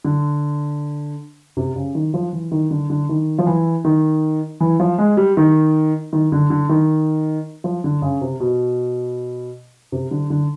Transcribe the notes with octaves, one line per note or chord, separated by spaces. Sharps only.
D3
C3
C#3
D#3
F3
E3
D#3
D3
D3
D#3
F3
E3
D#3
E3
F3
G#3
G3
D#3
D#3
D3
D3
D#3
F3
D3
C#3
C3
B2
C3
D3
D3